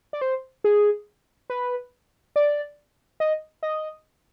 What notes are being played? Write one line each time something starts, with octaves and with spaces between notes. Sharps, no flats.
D5
C5
G#4
B4
D5
D#5
D#5